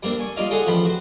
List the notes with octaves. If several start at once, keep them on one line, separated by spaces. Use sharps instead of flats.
G3 A#3 C4 D4
G#5 C#6
G3 D#4 F4 D5 D#5 F5
F4 G#4 A4 D#5 F#5 A5
A1 F3 G5 B5
F#4 C5